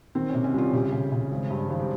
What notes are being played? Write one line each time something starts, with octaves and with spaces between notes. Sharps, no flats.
D#3 C4
C3 C#4
C#4
C2 F4
C#3 G4
C#3
C#3
G#1
G2
G#1
G4